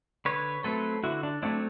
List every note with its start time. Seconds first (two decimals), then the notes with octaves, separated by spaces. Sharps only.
0.25 D3 B4 C#5
0.64 F#3 A3 C4 A4 B4
1.03 D3 E4 F#4
1.23 D4
1.43 F#3 A3 C4 D4 E4